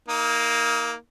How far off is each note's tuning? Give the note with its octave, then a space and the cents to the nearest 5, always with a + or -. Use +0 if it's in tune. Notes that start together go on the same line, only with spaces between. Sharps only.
A#3 +0 D#4 +35